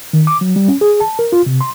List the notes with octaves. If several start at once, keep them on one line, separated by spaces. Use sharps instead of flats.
D#3
D6
F#3
G3
C#4
G#4
A5
A#4
F4
C3
C6